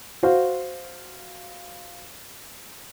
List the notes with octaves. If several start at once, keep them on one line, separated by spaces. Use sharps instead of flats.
F#4 C5 F5